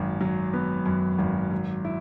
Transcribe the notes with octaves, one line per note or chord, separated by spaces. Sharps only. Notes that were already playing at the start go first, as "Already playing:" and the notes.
Already playing: G#1 F#2 F#3
F#3
B3
F#2
G#1
F#3
E4